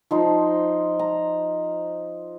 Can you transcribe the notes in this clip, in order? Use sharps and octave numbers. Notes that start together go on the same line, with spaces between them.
F3 D#4 C5
A#5